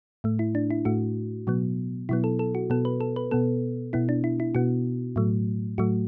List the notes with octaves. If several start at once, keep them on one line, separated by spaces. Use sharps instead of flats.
A2 A3
E4
D4
E4
A2 A3 F#4
B2 F#3 B3
B2 F#3 B3 E4
A4
A4
F#4
B2 B3 A4
B4
A4
B4
B2 B3 A4
B2 B3 E4
D4
E4
E4
B2 B3 F#4
A2 F#3 A3
A2 F#3 A3 F#4